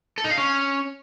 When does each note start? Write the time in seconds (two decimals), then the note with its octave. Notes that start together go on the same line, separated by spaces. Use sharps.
0.18 A4
0.24 D#4
0.31 F5
0.38 C#4